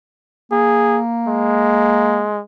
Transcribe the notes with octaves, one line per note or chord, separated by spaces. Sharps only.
A#3 G#4
G#3